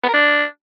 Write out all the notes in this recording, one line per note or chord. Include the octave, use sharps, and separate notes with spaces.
B3
A#4
D4